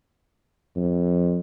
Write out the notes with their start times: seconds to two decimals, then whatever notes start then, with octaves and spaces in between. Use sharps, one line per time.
0.76 F2